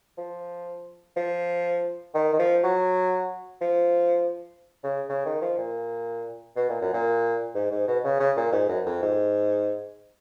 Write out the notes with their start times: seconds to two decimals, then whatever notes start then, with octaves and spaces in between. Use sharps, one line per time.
0.18 F3
1.16 F3
2.14 D#3
2.33 D#3
2.39 F3
2.64 F#3
3.61 F3
4.84 C#3
5.09 C#3
5.25 D#3
5.42 F3
5.58 A#2
6.56 B2
6.69 A#2
6.81 F#2
6.93 A#2
7.55 G#2
7.71 G#2
7.87 B2
8.04 C#3
8.20 C#3
8.37 A#2
8.52 G#2
8.69 F#2
8.86 F2
9.02 G#2